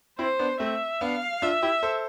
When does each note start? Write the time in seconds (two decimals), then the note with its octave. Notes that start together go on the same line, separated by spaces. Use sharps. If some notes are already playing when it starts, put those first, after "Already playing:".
0.19 C4 E4 C5
0.39 B3 D4
0.60 A3 C4 E5
1.01 B3 D4 F5
1.42 D4 F4 E5
1.62 E4 G4
1.83 A4 C5